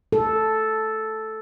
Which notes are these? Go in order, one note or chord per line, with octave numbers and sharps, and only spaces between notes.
A4